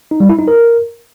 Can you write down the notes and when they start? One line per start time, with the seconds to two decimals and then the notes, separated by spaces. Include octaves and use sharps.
0.11 D#4
0.20 G3
0.29 E4
0.39 D#4
0.48 A#4